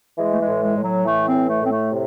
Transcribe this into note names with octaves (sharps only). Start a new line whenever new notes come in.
E3 G#3
A3
G#3
A2
G#3
A2
F#3
E3 A3
C4
A2
A3
A2 C4
A3
C3